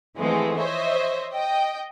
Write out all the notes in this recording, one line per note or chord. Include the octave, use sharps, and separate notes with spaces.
E3 F3 G#3 A3 B3 C4
C5 C#5 D#5 E5
D#5 G5